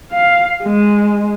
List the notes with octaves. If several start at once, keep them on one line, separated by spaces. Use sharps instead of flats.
F5
G#3